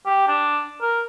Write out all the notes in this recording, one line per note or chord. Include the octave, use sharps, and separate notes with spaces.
G4
D4
A#4